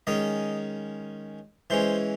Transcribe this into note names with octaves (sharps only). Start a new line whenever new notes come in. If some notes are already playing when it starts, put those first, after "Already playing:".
D#3 G#3 C#4 D#5
E3 G#3 C#4 C5